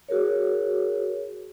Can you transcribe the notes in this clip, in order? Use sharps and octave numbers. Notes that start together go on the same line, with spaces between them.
F#4 G#4 A#4 C#5